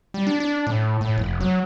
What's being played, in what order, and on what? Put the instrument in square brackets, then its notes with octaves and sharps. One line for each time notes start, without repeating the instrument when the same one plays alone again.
[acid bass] G3
D4
D4
A2
A2
F1
F#3